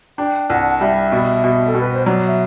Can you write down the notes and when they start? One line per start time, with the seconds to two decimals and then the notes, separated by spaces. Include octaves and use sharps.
0.18 D4 G5
0.50 C2 F#5
0.81 G3 E5
1.12 B2
1.44 B2
1.67 A4
1.75 B2
1.80 B4
1.94 C5
2.06 F#3 D5
2.27 E5